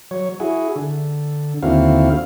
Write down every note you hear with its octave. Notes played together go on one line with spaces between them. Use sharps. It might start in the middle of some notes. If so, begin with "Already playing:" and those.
F#3 C#5
E4 F#4 G#4
D3
D#2 D3 C4 E4 F#4 F5